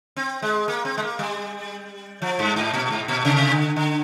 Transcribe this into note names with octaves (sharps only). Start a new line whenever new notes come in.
C4
G#3
A#3
C4
G#3
A#3
G3
F3
G2
G#2
A#2
G#2
A#2
C3
D3
D3